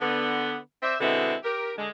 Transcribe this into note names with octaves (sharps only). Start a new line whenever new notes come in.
D3 B3
C4 C5 D5 E5
B2 D3 G#3 B3 C4 E4
G4 A#4
D3 G#3